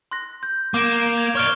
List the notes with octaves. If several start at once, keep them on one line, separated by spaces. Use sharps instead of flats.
C6 F#6 A#6
G6
A#3 D6 E7
G#6 F7
C#5 D5 C#6 F6 G7